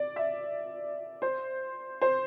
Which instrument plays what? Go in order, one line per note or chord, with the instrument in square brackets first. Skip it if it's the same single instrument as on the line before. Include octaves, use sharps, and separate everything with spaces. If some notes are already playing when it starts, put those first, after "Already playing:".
Already playing: [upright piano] D5
E5
C5
C5